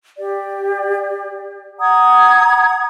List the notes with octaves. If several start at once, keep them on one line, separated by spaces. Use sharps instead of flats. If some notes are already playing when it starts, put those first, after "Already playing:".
G4 D5
F#5 A#5 D#6 G#6